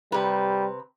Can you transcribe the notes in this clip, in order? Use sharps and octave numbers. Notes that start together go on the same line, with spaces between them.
C3 G3 B4